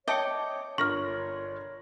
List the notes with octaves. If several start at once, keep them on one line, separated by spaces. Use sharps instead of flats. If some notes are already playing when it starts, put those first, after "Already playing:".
C#5 D#5 E5 G5 A5 D6 C#7
G1 F4 A#4 C#5 C#6 F6 A#6